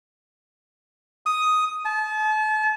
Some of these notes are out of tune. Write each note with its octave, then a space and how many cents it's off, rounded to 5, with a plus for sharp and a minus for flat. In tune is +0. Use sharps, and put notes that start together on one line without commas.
D#6 +5
A5 -35